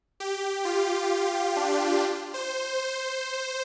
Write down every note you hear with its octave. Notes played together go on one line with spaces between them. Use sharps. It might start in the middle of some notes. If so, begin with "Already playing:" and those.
G4
F4
D4
C5